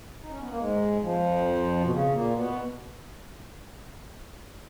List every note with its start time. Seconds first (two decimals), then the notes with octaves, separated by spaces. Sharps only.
0.22 D#4
0.31 C#4
0.40 B3
0.50 A#3
0.58 G#2 G#3
1.02 F2 F3
1.84 B2
1.91 C#3
2.13 A#2 A#3
2.36 B2 B3